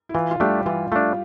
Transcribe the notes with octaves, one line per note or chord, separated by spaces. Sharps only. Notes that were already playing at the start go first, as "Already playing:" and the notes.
E4
E3 F4
F4
G3 A3 D4 G4
E3 F4
A3 D4 F4